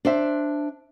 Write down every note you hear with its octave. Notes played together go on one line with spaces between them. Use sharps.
D4 C5 E5